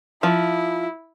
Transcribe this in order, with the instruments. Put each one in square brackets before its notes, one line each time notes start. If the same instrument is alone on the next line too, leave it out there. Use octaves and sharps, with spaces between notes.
[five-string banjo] F3 [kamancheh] E4